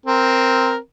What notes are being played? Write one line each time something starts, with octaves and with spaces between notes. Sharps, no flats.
C4 A#4